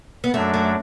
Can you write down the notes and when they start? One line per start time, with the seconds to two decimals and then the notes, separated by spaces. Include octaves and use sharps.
0.24 B3
0.34 F#2 F#3 A3 D4
0.54 A3